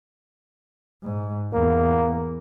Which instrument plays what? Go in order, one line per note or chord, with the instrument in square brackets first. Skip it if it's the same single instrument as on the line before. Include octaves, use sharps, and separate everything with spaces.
[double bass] G#2
[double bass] E2 [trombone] A#3